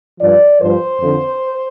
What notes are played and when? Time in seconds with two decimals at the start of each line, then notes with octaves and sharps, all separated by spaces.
0.19 G2 F3 D5
0.60 G2 F3 C5
1.00 F2 D3 F3